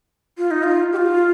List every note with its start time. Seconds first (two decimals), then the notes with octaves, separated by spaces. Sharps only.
0.38 F4
0.51 D#4
0.63 F4
0.92 G4
0.96 F4